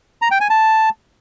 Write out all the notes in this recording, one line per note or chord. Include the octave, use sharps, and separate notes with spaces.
A#5
G5
G#5
A5